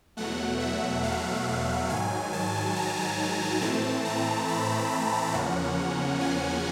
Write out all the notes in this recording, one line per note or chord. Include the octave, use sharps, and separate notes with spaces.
E2 B2 F#3 A3 F#5
E5
F5
G#2 D#3 F#3 G#5
A5
A#5
A2 E3 A3 C4 A5
A#5
B5
A#5
E2 C#3 F3 A#3 C#4 F#5
G#5